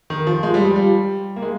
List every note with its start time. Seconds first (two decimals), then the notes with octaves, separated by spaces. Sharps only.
0.10 D#3
0.27 F3
0.43 G#3
0.54 G3
0.65 F3
0.76 G3
1.36 A#3
1.42 G#3